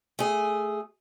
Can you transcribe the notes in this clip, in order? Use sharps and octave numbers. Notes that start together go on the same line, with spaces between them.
A3 G#4